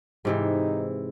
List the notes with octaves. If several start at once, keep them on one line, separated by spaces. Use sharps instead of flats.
G#2 C3 E3 D#4